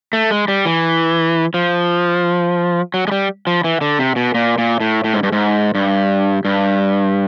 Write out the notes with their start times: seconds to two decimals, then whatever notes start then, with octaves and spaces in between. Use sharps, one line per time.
0.13 A3
0.31 G#3
0.48 G3
0.66 E3
1.54 F3
2.94 F#3
3.08 G#3
3.12 G3
3.47 F3
3.64 E3
3.81 D3
3.99 C3
4.16 B2
4.34 A#2
4.58 A#2
4.80 A2
5.04 A2
5.14 G#2
5.23 G2
5.32 G#2
5.75 G2
6.45 G2